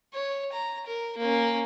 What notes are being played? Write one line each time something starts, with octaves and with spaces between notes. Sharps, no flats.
C#5
A#5
A#4
A#3 C#4